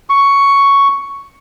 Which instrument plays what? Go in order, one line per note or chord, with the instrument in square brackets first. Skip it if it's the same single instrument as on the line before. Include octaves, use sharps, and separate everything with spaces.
[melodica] C#6